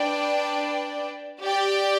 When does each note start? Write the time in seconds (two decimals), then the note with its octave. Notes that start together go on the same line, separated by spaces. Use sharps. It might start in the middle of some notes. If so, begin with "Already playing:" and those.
Already playing: D4 B4 D5 G5
1.41 G4 D5 G5